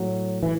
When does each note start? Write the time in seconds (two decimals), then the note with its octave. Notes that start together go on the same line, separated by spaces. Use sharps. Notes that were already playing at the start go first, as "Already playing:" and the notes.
Already playing: A2 F#3
0.43 E3